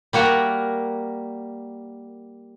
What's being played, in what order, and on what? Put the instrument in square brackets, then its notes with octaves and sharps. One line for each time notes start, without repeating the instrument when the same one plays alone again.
[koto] G3 A#3 F#4 A#4